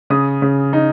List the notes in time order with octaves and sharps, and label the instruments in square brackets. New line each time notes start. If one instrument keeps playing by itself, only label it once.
[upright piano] C#3 D#6
C#3
D#4